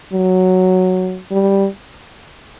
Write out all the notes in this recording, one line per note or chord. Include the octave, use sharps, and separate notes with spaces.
F#3
G3